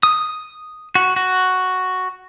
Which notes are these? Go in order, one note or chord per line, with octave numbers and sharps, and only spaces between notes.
D#6
F#4
F#4